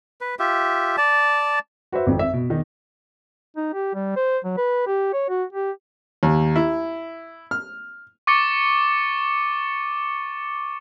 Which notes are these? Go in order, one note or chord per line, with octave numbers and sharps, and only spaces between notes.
B4
F4 G4 E5
D5 A5
F#4 B4 C5 E5
G#1 F2
E5
B2
E2 D#3 D#4
D#4
G4
G3
C5
F#3
B4
G4
C#5
F#4
G4
D#2
E4
F6
C#6 D6 A6 C#7 G7